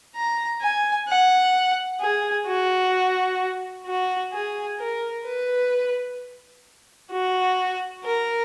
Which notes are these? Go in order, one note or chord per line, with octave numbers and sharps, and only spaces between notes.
A#5
G#5
F#5
G#4
F#4
F#4
G#4
A#4
B4
F#4
A#4